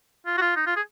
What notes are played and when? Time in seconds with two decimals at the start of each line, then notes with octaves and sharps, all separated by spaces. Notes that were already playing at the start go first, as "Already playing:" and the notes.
0.26 F4
0.38 F#4
0.41 F4
0.56 D#4
0.67 F4
0.76 G#4